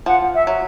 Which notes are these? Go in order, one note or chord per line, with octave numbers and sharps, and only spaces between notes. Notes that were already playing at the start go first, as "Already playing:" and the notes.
F3 F#5
E5
F#3